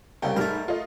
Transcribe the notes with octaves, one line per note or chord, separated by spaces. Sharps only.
C2 C#3 G5
G#2 G3 A3 A#4
F4 A4 D#5